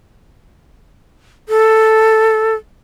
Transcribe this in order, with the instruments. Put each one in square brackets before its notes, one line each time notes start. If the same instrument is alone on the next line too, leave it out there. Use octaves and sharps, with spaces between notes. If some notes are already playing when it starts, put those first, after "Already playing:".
[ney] A4